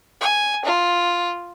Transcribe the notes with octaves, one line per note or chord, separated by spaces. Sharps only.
G#5
F4